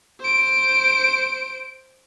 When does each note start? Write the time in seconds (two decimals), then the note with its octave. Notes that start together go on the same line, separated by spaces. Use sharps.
0.20 C5 D7